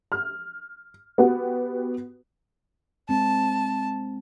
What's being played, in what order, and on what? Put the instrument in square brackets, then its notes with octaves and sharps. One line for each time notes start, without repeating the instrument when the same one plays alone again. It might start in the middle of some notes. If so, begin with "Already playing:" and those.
[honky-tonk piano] F6
B3 F#4 G4 B4
[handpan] G#3 C4 [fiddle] A5